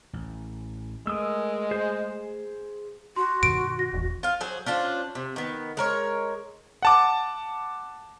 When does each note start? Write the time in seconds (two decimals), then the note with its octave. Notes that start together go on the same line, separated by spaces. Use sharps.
0.13 A1
1.07 G#3 A3 A#4 D#6 E6
1.71 G#4 C5 G6
3.16 F#4 C6
3.43 G2 B2 D#3 D7
3.79 A#6
3.93 E1 A1 E2
4.23 F4 F5
4.41 F#3 G#4 C5
4.66 C#4 D4 F4 C5
5.15 C3
5.36 D#3 B3
5.77 G#3 A#4 C#5
6.82 F#5 A5 D6